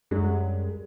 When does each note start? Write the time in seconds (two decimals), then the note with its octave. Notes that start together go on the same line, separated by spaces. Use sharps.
0.11 F#2 G3 G#3